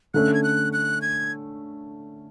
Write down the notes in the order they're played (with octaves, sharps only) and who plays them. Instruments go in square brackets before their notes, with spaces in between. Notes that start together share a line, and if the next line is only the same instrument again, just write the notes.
[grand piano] D3 A3 C#4 [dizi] F#6
[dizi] G#6
F#6
F#6
G#6